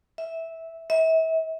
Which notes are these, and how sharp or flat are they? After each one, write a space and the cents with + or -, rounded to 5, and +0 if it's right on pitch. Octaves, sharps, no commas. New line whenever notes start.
E5 -10
E5 -35